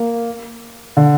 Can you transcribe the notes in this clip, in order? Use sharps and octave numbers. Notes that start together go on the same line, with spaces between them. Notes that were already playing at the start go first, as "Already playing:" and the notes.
Already playing: A#3
D3